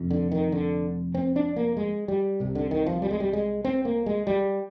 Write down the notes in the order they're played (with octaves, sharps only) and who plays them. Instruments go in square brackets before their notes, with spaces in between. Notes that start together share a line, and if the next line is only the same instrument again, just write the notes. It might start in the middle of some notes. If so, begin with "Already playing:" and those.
Already playing: [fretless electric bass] F1 F2
D3
D#3
D3
C4
D4
A#3
G#3
G3
C2 C3
D3
D#3
F3
G3
G#3
G3
G#3
C4
A#3
G#3
G3